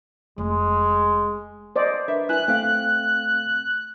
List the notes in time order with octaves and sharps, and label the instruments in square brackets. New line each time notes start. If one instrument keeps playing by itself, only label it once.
[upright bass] F1 [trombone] G#3
[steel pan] C5 D5 D#5
[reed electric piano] D4 A#4 B4 [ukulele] E5
[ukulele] E4 G#5 [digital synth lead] F#6
[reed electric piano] A3 C4 F5 [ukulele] G4